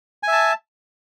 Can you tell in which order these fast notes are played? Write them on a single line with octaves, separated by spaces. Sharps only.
G#5 E5 A5